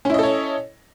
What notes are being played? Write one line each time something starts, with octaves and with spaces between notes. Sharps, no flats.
C#4 E4 A4 C#5 D#5